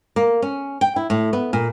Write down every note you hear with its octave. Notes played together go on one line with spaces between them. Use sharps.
A#3
C#4
G5
E4
A2
B3
A#2